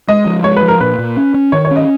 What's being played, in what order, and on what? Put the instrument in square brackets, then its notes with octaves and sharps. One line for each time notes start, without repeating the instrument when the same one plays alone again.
[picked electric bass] G#3 [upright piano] D#5
[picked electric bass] F3
[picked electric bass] G#3 [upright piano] C#5
[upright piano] B4
[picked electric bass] F3
[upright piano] A#4
[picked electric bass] A#2 [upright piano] B4
[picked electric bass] A#2
C#4
C#4
[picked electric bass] D#3 [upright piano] C#5
[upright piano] C#5
[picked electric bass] C#4
[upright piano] D#5